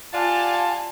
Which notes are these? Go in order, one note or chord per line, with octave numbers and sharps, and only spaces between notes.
F4 G4 D5 F#5 G#5 A5